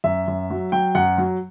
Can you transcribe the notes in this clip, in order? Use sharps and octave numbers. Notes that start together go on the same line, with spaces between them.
F#2 E5
F#2
F#3
F#3 G5
F#2 F#5
F#3